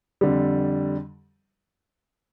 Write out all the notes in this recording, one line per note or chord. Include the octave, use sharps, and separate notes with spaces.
F2 D3 G3